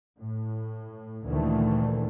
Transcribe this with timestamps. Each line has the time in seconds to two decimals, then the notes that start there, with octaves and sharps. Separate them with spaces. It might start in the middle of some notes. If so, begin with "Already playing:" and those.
0.21 A2
1.27 D2 A#2 D#3 E3 A3